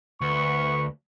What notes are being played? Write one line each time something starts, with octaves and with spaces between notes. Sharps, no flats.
D2 B4 C#6